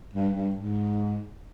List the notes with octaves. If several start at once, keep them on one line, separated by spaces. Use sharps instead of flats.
G2
G2
G#2